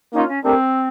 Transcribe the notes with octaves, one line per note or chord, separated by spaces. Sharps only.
A#3 C#4 D#4 F4
C#4
A3 C4 D4 G4 A#4